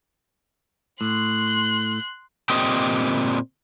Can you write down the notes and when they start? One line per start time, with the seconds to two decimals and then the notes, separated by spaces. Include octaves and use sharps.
1.01 A2 C6 F#6
2.50 A#2 C4 G4 D#5